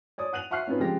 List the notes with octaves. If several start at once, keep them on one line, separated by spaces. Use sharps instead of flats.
C#5 D5 D#6
F#5 F#6 D#7 F7 F#7
E5 F#5 C#6 F6 F#6 C7
C4 C#4 D#4 F4 B4
C#3 F3 G#3 G4 A#6